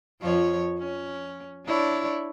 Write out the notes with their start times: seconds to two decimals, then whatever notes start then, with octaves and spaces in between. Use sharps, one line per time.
0.21 F2 F3 C#5
0.79 C#4
1.66 D4 E4 C#5